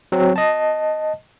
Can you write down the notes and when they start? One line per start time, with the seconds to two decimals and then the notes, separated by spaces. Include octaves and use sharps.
0.12 F#3 C4
0.36 D#5 A5